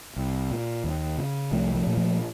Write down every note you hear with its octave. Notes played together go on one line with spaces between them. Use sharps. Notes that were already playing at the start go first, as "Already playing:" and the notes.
C2
A#2
D#2
C#3
C2 F3 A3
F3 A3
A#2
F3 A3